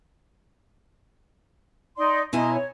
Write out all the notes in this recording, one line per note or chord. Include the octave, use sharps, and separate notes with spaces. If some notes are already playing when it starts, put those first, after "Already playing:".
D#4 D5 C6
B2 E4 D#5 G#5 A#5 C6
C#5